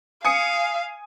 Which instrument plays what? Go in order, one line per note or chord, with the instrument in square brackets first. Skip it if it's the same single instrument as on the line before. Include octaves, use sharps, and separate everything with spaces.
[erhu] F5 [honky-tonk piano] G#5 D#6 C#7